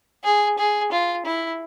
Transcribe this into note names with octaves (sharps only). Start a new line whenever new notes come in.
G#4
G#4
F4
E4